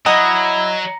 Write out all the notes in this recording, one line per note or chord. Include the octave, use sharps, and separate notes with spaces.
F#3 E4 D#5 F#5 A#5 D#6 A#6